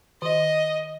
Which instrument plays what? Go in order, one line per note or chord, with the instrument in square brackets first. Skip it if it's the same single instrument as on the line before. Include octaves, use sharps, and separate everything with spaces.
[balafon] D#3 [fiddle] D#5